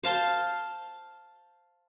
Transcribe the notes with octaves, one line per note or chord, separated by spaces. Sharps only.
C5 F5 A5 C6